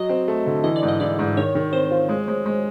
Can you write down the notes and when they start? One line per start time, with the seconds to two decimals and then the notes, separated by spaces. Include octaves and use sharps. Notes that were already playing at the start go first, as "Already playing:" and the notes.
Already playing: F#3 D#5
0.09 C4
0.28 A3
0.46 D3
0.64 E3 D#5
0.76 D5
0.83 G#2
0.88 D#5
1.00 E3 D5
1.19 G#2
1.37 D#3 C#5
1.55 D#3
1.73 C4 C5
1.91 F4
2.09 G#3
2.28 G#3
2.46 G#3